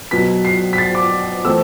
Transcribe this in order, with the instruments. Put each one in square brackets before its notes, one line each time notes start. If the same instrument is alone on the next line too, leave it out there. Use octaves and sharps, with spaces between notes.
[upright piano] B2 F#3 B3 B6
C7
B6
A6
D6
E3 A3 C4 E6